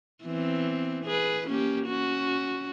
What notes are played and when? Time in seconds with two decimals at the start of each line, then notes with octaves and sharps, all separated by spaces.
0.23 E3 B3 C4
1.05 G#4 B4
1.47 A#3 C#4 G4
1.87 C#4 F#4